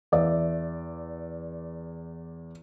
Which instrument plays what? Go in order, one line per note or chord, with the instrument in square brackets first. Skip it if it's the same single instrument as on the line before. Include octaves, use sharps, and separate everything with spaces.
[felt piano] E2 D5 E5